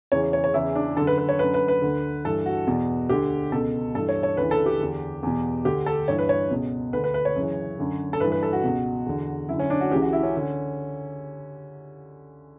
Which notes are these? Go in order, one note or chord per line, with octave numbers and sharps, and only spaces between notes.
E2 C#3 E3 C#5
C#5
C#5
E2 C#3 E3 E4
D4
F#2 D3 A4
B4
B4
C#5
F#2 D3 B4
B4
B4
D2 D3
G2 E3 A4
F#4
E2 B2
D2 D3 G4
C#2 B2 A4
G2 E3 A4
C#5
C#5
D2 C#3 E3 B4
A4
G4
E2 D3
E2 B2
D2 D3 G4
A4
G2 E3 C#5
B4
C#5
C#2 B2
D2 D3 B4
B4
B4
C#5
F#2 C#3 E3
F#2 D3
A4
G2 E3 B4
B4
A4
F#4
C#2 B2
E2 D3
F#2 E4
D3
C#4
D4
F#4
C#2 C#3 E3 G4
F#4
E4
C#4
D3